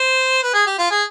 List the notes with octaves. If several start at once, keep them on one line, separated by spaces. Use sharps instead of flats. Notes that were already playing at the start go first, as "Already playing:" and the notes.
Already playing: C5
B4
G#4
G4
F4
G#4